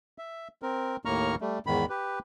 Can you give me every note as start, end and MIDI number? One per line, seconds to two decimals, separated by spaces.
0.18 0.48 76
0.62 0.96 60
0.62 0.96 70
1.05 1.35 39
1.05 1.35 45
1.05 1.35 58
1.05 1.35 82
1.05 1.35 85
1.05 1.35 89
1.41 1.59 55
1.41 1.59 57
1.67 1.86 40
1.67 1.86 44
1.67 1.86 51
1.67 1.86 83
1.89 2.19 67
1.89 2.19 71